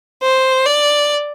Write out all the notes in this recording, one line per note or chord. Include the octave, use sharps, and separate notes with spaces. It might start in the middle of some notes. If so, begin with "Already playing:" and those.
C5
D5